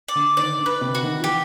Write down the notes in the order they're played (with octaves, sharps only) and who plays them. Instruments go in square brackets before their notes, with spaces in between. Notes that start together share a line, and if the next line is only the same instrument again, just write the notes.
[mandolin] D5
[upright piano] D3
[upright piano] D#3 [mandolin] D5
[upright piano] D3
[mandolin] B4
[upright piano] C3
[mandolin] F#4
[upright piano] D#3
F3
[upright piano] E3 [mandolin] G4